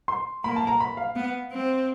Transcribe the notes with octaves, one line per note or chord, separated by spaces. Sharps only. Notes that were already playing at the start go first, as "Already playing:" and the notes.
C6
A#3 B5
A5
A#5
B5
F5
B3
C4